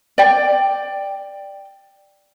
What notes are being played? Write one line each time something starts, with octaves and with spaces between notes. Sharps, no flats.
D5 G5